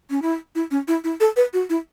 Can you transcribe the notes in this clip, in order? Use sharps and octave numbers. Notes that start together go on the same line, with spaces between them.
C#4
E4
E4
C#4
E4
E4
A4
B4
F#4
E4